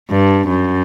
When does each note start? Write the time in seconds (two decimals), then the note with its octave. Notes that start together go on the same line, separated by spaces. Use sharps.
0.11 G2
0.49 F#2